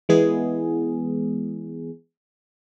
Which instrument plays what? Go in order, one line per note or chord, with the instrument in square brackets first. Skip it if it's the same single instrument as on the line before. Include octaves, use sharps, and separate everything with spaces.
[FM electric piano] E3 G#3 B3 G#4